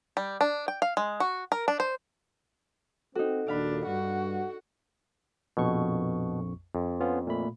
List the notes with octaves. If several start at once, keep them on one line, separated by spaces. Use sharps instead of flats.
G3
D4
G5
F5
G#3
F#4
A#4
D4
C5
C4 D#4 F#4 A4
D#2 A#2 D4 F5 B5
G2 F#4
A#1 F2 B2 C#6
F2
B3 C#4 F4
A#2 A3 B5